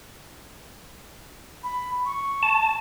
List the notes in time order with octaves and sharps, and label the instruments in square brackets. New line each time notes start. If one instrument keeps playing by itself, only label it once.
[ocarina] B5
C#6
[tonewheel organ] A5